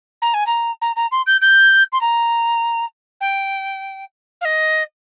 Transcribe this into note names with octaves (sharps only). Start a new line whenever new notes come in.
A#5
G#5
A#5
A#5
A#5
C6
G6
G6
C6
A#5
G5
F5
D#5